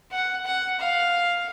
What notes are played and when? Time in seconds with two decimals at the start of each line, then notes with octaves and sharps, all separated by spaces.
0.11 F#5
0.45 F#5
0.79 F5